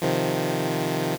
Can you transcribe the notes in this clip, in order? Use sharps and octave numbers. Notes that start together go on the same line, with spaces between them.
C3 D#3 F3